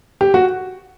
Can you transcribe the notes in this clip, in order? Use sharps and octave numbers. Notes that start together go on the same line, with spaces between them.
G4
F#4